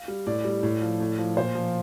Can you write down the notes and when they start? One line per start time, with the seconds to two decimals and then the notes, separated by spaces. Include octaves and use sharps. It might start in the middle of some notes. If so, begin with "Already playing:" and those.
Already playing: F5
0.08 G3
0.27 A2 D5
0.45 G3
0.63 A2
0.82 F3
1.00 A2
1.18 F3
1.37 A#2 C5
1.55 F3